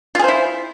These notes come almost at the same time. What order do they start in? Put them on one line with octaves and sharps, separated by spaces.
F4 G#4 C5 E4